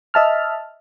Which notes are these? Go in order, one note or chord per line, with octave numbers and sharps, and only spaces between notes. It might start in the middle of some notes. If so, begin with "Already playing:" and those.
D#5 E5 A5 F6